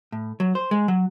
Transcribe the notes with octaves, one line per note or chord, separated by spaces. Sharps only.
A2
F#3
C5
G#3
F#3